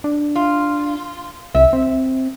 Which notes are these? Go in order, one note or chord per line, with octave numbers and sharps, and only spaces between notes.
D4
F4
C2 E5
C4